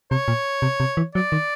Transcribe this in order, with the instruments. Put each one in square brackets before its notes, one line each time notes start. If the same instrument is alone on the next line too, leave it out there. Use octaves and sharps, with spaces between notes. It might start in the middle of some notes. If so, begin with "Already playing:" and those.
[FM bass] C3 [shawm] C#5
[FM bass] A#2
C3
C3
E3
[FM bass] F#3 [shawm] D5
[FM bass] D#3